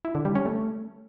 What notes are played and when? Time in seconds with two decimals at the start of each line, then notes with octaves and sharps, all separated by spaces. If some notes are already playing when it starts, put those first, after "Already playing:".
0.05 E4
0.15 D3
0.25 G3
0.35 C#4
0.46 A3